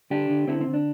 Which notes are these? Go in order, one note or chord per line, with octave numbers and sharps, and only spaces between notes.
D3 D4 G4
D3
D3 C4 E4
C4
D3
D4